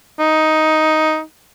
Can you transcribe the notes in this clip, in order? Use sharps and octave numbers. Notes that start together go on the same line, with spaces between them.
D#4